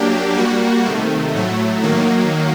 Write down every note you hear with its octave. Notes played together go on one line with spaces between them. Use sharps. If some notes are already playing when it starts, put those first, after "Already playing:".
Already playing: F#3 A#3 D4 G4
G3 A#3 F#4
C3 D#3 A3
A2 F#3 A3
D#3 F#3 A#3